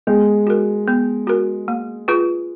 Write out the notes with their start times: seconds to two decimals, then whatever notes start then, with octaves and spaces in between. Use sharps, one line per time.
0.07 G#3 B3
0.47 F#4 A#4
0.88 B3
1.27 F#4 A#4
1.68 A#3
2.08 F4 G#4 B4